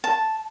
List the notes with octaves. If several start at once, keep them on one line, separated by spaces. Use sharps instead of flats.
A5